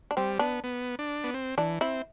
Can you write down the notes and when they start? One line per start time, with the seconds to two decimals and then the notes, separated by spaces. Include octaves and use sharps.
0.11 D4
0.17 G3 C4
0.39 B3 D4
0.64 B3
0.99 D4
1.24 B3
1.34 C4
1.58 E3 D4
1.81 C4 E4